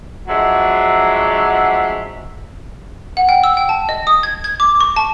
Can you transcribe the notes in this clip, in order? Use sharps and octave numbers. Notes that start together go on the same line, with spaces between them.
F3 F#3 G#3 D4 F#4 E5
F#5
G5
E6
G5
A5
D#5
D#6
G#6
G#6
D6
C#6
A5